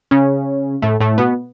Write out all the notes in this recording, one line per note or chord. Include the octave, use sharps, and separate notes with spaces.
C#3 C#4
A2 A3
A2 A3
B2 B3